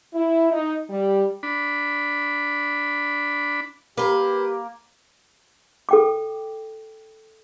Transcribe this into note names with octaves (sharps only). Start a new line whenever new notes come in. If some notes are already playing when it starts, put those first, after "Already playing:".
E4
D#4
G3
D4 B5
A#3 G4 B4 C5
A4 G5 D6